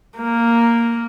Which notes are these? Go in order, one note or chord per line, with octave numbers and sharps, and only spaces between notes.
A#3